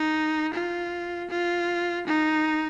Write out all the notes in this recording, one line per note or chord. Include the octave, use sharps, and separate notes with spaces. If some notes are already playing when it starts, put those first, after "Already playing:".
Already playing: D#4
F4
F4
D#4